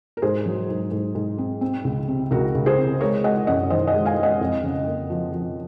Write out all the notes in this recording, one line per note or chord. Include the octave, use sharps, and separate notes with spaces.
A#4
G#2 G#4 C5
F#3
G#2
G#2
G#2
C4
C4
C#2
C3
C#2 F#4 A#4
C#2
G#4 C5
C3
G#3 A#4 C#5
G#3 D#5 F#5
F#2 D#5 F#5
D#3 C5 D#5
D#5 F#5
G#3
F5 G#5
G#3
D#5 F#5
F2
C#3
A#3
F3
F3